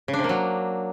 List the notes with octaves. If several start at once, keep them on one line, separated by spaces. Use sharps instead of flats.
C#3
D4
C3
A#3
F#3